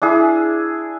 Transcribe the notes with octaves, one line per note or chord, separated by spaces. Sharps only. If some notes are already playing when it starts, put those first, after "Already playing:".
D4 E4 G#4